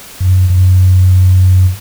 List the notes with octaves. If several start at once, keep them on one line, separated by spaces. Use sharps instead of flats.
F#2
F#2